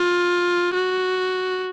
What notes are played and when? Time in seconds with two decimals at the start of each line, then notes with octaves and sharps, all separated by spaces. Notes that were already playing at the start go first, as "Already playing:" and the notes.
Already playing: F4
0.74 F#4